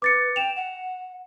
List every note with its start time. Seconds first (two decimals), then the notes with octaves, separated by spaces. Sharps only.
0.02 B4 D6 A6 C#7
0.36 G5 E7 F7
0.56 F#5